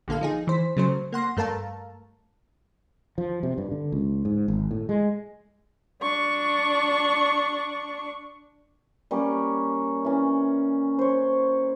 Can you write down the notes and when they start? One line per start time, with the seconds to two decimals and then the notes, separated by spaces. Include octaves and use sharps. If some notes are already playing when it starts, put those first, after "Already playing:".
0.08 A#1 D3 A#3 A4 F5
0.21 F3 D#4 G#4
0.47 E3 C5 B6
0.77 C#3 F#3 A3 C5
1.13 A#3 F#5 C6 A#6
1.37 G2 A3 A#4 F5 A5 A#5
3.18 F3
3.43 C3
3.58 G2
3.72 D3
3.92 C#2
4.25 G#2
4.48 G#1
4.71 A2
4.89 G#3
6.02 D4 C#6
9.11 G3 A#3 C#4 C#5
10.05 E3 C#4
10.99 C5 C#5